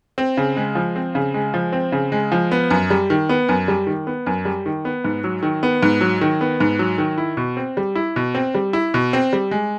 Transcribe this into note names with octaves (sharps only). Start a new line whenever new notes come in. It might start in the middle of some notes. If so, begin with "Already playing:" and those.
C4
C#3
G#3
F3
C4
C#3
G#3
F3
C4
C#3
G#3
F3
B3
F#2
G3
D#3
B3
F#2
G3
D#3
B3
F#2
G3
D#3
B3
G#2
F#3
D#3
B3
G#2
F#3
D#3
B3
G#2
F#3
D#3
E4
B2
C4
G3
E4
B2
C4
G3
E4
B2
C4
G3
G#3